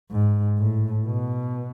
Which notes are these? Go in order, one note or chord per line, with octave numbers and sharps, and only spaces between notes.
G#2
A2
B2